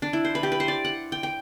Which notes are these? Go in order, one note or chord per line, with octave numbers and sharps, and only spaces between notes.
D4
E4
C5
B4
G4
B4
C5
D5
F#5
G5
G5